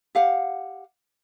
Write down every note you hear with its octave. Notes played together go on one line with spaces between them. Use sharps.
G4 F5 F#5